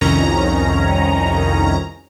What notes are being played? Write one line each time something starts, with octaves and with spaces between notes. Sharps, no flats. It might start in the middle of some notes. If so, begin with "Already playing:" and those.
C2 F2 D#3 C#4 A#5